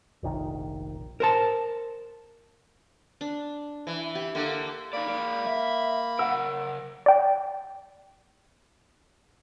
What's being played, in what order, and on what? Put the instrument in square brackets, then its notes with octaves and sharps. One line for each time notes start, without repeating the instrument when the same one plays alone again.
[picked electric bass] F1 A#1 D#3
[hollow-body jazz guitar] A#4 C5 A5
[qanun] D4
[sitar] E3
[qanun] G4
[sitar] D3 A#3
[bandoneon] A#3 B5 [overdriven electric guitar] D#4 D5
[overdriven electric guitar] G#3 D5
E5
[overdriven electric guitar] C#3 A#4 [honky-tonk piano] F#5 E6
[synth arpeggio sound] D5 G5